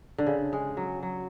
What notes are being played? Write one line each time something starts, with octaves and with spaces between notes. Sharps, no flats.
D3
C#3
G#3
F#3
F#3